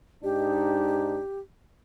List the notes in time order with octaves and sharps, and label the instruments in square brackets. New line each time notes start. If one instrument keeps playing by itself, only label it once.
[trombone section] G#2 D4 D#4 [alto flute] G4